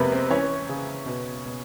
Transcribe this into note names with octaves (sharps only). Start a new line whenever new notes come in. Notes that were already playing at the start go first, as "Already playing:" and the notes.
Already playing: F2 C3 G#3 A#3 B3 A#4 B4
C4 C5
E3 C#4 C#5
C#3
B2
B2